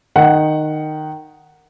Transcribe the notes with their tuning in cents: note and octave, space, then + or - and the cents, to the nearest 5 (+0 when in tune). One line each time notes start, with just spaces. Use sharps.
D#3 -15 F#5 +0